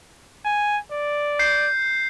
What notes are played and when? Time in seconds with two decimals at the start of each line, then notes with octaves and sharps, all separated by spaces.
0.45 G#5
0.91 D5
1.39 G6 C7